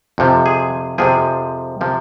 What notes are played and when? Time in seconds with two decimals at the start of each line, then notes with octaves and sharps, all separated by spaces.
0.18 F2 C3 F3
0.46 G#4
0.98 F2 C3 F3 G#4
1.81 C3 F3